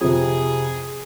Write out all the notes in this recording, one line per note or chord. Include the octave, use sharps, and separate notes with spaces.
F2 C3 G#4